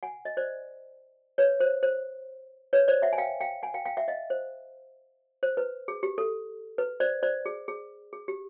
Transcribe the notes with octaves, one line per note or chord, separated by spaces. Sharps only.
F#5 G#5
D#5
C5 D5
B4 C#5
C5
C5
B4 C#5
C5 D5
E5 F#5
G#5
F5 G5
F5 G5
F#5 G#5
F5 G5
F5 G5
E5 F#5
D#5 F5
C5
C5
B4
G#4
G4
A4
B4
C5 D5
C5 D5
G#4
G#4
G#4
G4